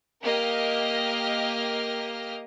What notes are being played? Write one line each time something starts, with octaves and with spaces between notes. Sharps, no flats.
A#3 G4 A#4 D#5 F6